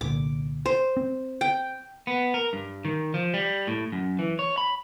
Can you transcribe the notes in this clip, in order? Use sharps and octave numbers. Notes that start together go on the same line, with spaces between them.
C2 A#2 D3 D6
C5
C4
G5
B3
A#4
G2
D#3
F3
G3
A2
F#2
E3
C#5
B5